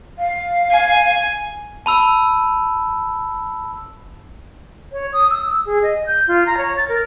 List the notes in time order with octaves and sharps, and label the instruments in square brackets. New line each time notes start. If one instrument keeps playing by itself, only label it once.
[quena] F5
[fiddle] G#5
[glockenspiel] A5 B5 E6
[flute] C#5
D#6
E6
E6
G#4
D#5
G6
F4
A#5
C#5
A6
A#4